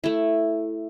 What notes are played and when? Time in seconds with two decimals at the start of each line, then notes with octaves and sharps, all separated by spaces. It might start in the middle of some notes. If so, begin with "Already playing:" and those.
0.04 A3 E4